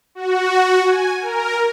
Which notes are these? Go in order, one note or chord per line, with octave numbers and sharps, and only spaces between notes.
F#4
G#5
A#4